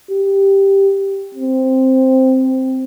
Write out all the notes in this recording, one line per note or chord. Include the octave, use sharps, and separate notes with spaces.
G4
C4